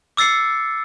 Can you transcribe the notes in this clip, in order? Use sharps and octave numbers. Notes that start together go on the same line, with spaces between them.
D6 E6 A6 C7 C#7